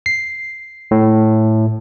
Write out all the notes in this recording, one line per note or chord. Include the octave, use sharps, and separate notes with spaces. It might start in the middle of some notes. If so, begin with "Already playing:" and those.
C7
A2